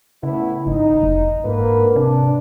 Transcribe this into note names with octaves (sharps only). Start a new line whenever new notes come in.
A2 C#3 B3 E4
G#1 D#4
F1
G#2 D3 A#3 B4
C3 D4